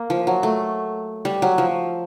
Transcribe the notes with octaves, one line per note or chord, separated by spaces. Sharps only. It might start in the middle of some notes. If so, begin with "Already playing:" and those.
Already playing: A#3
F3
F#3
A3
G3
F#3
F3